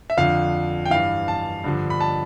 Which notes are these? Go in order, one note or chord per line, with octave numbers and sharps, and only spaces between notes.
E5
F2 D3 F3 F5
G5
G2 E3 F5
A5
G2 D3 F3
B5
A5